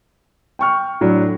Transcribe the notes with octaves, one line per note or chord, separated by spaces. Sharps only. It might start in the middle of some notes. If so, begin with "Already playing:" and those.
G5 C#6 F6
A2 F#3 D4